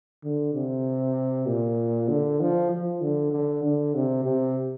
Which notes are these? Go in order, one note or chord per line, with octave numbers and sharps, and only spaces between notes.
D3
C3
A#2
D3
F3
F3
D3
D3
D3
C3
C3